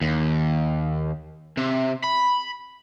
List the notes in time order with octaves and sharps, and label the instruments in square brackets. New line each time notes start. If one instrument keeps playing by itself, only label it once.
[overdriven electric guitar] D#2
C3
B5